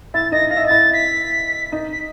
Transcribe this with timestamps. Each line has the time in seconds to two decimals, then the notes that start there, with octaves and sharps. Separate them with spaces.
0.14 E4 E5 A6
0.31 D#4 D#5 A#6
0.50 F5 A#6
0.57 E5
0.64 D#5
0.67 E4 E5 A6
0.93 B6
1.72 D#4 D#5
1.92 B6